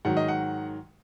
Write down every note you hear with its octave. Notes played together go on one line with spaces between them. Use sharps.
G#2 D#3 F#3 F#5
D#5
F#5